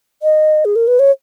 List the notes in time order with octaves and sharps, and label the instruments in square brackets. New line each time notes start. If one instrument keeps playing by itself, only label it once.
[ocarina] D#5
G#4
A#4
B4
C#5